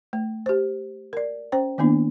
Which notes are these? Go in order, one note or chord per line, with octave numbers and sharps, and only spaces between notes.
A3
G4 C5
A#4 D5
C#4 C5 G5
D#3 A#3 B3 D4 E4